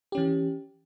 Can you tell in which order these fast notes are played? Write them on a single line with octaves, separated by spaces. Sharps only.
G4 C#4 E3